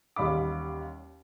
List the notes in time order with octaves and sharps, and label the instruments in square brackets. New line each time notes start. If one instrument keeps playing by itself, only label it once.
[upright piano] A1 D#2 G3 F5 B5 D6